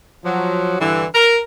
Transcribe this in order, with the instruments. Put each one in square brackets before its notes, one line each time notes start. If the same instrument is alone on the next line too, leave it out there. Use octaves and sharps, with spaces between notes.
[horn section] F3 F#3
G2 D3 E3
A#4